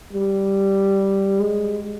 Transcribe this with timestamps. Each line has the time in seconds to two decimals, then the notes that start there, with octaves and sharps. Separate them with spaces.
0.13 G3
1.40 G#3